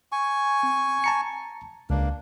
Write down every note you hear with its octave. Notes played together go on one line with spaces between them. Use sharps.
G#5 C#6
C4
A5 A#5 C#7
C#2 A#3 D4